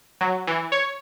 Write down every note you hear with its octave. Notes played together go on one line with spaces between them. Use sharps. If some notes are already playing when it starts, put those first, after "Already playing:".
F#3
E3
C#5